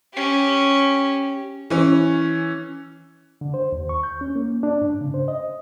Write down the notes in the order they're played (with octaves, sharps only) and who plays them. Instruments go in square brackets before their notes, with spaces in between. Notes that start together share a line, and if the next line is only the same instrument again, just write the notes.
[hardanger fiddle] C#4 G4
[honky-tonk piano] E3 C#4
[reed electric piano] D3
C5
D#2
C#6
G6
C#4
A#3
D4
G#2
C#3
C5
D#5